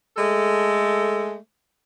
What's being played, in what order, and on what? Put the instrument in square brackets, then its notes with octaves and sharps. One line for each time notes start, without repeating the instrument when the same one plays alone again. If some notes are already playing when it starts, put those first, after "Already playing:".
[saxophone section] G#3 A3 A4